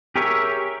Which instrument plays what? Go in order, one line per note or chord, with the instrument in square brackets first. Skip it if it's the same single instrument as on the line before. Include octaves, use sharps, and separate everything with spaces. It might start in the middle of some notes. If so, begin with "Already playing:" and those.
[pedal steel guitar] G4 G#4 A#4 C#5 E5